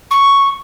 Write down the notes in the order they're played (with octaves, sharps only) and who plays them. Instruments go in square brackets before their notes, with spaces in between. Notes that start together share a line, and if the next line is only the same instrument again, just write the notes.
[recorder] C#6